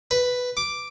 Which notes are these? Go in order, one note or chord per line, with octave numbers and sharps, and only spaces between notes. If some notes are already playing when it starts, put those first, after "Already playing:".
B4
D6